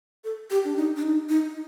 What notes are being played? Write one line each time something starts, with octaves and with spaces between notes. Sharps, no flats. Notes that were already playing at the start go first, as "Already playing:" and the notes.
A4
G4
D4
D#4
D4
D#4
D#4